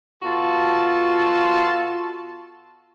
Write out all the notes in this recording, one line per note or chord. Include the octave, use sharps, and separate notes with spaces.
B2 F4 F#4 A4 A5